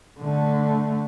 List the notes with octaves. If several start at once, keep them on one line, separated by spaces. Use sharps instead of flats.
D3 A3